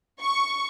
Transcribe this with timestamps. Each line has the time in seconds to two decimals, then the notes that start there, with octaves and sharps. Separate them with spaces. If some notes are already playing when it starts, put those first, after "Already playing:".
0.21 C#6